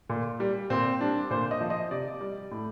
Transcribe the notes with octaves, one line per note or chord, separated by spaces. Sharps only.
A#2
G3
A#2 C4
G3 D4
A#2 C5
D#5
F3
D#5
C3 D5
G3
A2